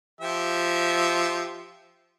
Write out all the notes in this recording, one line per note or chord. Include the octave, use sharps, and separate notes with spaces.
F3 G4 E5